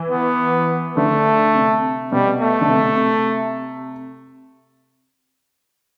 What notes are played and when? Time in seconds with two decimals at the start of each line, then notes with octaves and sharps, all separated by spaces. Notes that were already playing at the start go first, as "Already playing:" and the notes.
Already playing: E3
0.10 B3
0.97 D3 A3
1.55 C3
2.12 B2 G3
2.41 A3
2.61 D3
2.70 C3